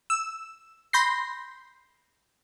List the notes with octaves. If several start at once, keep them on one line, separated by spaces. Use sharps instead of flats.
E6
B5 C6 G6 A#6 C7